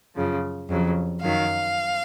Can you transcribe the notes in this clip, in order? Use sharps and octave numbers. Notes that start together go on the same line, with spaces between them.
F#2 C#3 F3
F2 C#3 F#3
F#2 D#3 F#3 F5